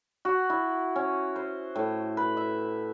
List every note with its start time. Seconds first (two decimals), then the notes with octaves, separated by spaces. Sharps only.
0.25 F#4
0.50 E4
0.96 C#4
1.36 C5
1.76 A2
2.17 B4
2.37 E5